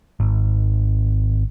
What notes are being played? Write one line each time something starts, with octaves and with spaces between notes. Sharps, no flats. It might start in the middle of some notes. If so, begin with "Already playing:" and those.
G#1